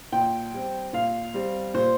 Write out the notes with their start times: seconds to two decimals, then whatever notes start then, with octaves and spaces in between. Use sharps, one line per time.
0.12 A#2 G5
0.53 G3 C4
0.93 A#2 F5
1.34 G3 C4
1.74 A#2 C5